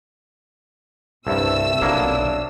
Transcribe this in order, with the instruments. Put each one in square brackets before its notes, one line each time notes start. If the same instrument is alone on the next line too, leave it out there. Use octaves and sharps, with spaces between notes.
[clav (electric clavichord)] C2 G2 [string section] C3 E6 [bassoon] A3
[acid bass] B1 [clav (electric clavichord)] F#3 A#3 E4 [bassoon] D4